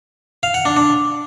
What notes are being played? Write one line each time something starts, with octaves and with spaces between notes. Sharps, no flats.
F5
F#5
D4
D4